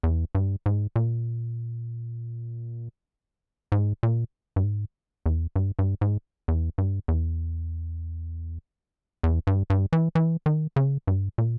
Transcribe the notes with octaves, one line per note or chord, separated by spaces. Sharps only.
E2
G2
G#2
A#2
G#2
A#2
G2
G#2
E2
G2
G2
G#2
E2
G2
E2
E2
G2
G2
E3
E3
D#3
C#3
G2
A#2